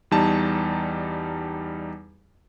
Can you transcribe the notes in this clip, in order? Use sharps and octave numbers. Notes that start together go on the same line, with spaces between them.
E2 G3 D#4 A5